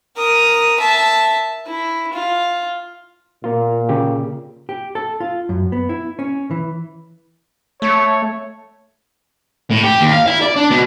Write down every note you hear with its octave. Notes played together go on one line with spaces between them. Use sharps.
A#4 D#6
E5 A5
E4
F4
A#2 A#3 F4
C#3 G4
G4
A4
F4
F#2
B3
E4
C#4
E3
A3 C#5
A2
G4
D#2
F5
E4
D5
D4
B2